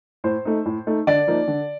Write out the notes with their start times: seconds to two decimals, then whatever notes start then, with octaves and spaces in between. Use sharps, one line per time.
0.24 A2 C5
0.45 A3 D#4
0.66 A2
0.87 A3 D#4
1.07 D3 D5
1.27 F3 A#3 D#4
1.48 D3